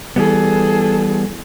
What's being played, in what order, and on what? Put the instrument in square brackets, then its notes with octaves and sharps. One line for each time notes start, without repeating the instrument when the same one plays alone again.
[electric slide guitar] E3 G3 B3 [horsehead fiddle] G#4 A4